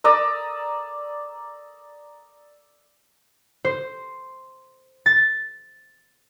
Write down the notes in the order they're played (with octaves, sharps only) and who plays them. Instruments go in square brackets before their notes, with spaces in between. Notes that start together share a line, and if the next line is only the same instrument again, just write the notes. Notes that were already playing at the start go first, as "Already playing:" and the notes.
[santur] D5 A#5 D#6 E6
[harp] C5
A6